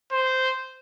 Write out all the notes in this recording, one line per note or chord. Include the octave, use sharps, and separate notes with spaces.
C5